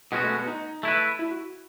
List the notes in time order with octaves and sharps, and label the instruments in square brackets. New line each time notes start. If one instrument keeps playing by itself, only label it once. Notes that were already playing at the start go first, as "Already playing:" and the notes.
[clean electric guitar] B2 G#3 C#4 F#4 [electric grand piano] B3
[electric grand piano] A3
B3
D#4
[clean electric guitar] A3 E4 B4
[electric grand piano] E4
F#4